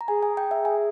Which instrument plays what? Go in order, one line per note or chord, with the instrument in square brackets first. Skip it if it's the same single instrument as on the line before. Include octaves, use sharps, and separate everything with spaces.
[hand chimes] A#5
[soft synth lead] G#4 [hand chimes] G#5
[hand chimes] G#5
G5
E5
G#5